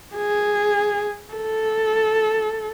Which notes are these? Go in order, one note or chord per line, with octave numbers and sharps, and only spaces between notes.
G#4
A4